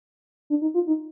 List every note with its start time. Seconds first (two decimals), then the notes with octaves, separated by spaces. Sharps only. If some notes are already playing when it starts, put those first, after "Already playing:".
0.50 D4
0.62 D#4
0.74 F4
0.87 D#4